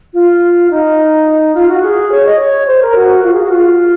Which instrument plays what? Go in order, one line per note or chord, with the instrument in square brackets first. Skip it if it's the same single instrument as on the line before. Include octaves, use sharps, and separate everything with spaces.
[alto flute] F4
D#4
F4
F#4
G#4
C#5
D#5
C#5
C5
A#4
F#4
F4
G#4
F#4
F4